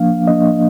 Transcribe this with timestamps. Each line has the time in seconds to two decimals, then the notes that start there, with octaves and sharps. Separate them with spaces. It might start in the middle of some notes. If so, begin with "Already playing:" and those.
Already playing: F3 A#3 D4 F5
0.27 F3 A#3 D4 D#5